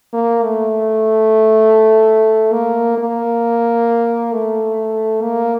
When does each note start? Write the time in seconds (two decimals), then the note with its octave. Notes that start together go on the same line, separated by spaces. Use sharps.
0.13 A#3
0.43 A3
2.53 A#3
2.98 A#3
4.33 A3
5.22 A#3